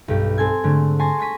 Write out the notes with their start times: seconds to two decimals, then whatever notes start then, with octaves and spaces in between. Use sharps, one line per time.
0.08 B1 G2 G4
0.38 C4 A4 G#5 G#6
0.64 G#2 D3 A3
0.99 G#5 A5 C6 C#6 A#6
1.19 C#6 G#6 A#6 B6 D#7